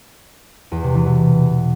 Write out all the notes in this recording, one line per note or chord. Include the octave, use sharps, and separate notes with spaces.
E2
C3
E3
B2